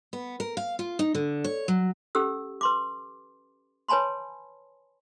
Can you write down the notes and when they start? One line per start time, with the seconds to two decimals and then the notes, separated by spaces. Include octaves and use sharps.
0.13 B3
0.40 A#4
0.57 F5
0.79 F4
0.99 D#4
1.15 D3
1.44 C#5
1.68 F#3
2.15 C#4 G4 A4 E6
2.61 B4 C6 D6
3.89 B4 C#5 G#5 A5 B5 C6